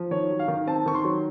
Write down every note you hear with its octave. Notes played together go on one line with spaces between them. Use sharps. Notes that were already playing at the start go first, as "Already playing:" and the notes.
Already playing: F3
D#3 C#5
F#3
F5
D#3
C4 A5
D#3 C#6
C6
F#3